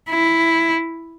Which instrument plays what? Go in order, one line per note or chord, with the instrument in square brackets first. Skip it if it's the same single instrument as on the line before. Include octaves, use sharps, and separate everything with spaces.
[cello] E4